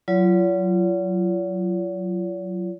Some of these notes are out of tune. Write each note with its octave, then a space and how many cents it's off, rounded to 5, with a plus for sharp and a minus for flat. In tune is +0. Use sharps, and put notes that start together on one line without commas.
F#3 -5 F4 -30 C#5 +45